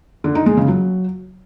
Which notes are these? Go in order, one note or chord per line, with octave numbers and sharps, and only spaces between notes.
D3
D#4
G#3
C#3
F#3